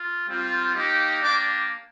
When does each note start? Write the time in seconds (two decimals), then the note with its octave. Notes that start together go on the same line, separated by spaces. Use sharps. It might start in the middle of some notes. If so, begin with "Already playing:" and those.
Already playing: F4
0.27 G3 C4 F4
0.74 A#3 D#4 G4
1.21 A#3 D4 G4 D5 D6